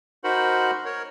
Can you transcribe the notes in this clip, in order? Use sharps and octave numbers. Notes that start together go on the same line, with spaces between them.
D#4 F#4 A#4 C5 F#5 B5
A#4 C#5